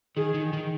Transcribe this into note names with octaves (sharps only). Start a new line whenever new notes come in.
D#3 G#4
D#3
D#3